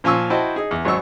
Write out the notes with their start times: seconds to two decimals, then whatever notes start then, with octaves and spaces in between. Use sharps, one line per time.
0.04 A#2 F3 F5 G#5 C#6 E6
0.30 E4 F#4 C5 D#5 G5 A5
0.56 D#4 G#4
0.71 E2
0.85 G#1 F#3 D#4 C#6 E6